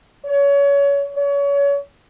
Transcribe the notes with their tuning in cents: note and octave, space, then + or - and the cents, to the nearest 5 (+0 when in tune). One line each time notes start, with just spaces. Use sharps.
C#5 +25
C#5 +30